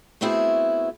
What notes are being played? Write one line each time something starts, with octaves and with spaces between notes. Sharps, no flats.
A3 B3 C4 E4 F#4 G#4